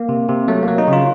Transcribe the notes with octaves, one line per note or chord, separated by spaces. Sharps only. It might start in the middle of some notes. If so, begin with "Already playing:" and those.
Already playing: A#3
C3
C3
F#3 A3
F#3 A#3
D#4
C#3
F4